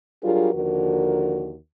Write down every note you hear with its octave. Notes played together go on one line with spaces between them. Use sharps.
F#3 G3 D4 F4 G#4 A#4
D#2 D3 F3 F#4 A#4